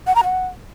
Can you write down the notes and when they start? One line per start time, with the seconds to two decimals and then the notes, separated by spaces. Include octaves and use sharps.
0.07 F#5
0.15 A#5
0.24 F#5